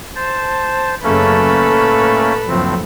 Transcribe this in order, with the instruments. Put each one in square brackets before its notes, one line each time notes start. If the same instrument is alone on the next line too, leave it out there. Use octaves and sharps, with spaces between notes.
[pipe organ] C5 A5
[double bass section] F#2 C#3 [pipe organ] A3 A#3 C#4 [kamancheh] A4 B4
[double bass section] A2
[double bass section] F#1 D2 F3 [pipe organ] A2 C4